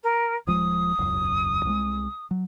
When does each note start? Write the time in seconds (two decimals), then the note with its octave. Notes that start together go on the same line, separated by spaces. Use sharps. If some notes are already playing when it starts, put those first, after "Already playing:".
0.03 A#4
0.47 D#1 F3 G#3 D#6
0.98 E1 C#2 F#2
1.65 C2 F3 G#3
2.31 F#3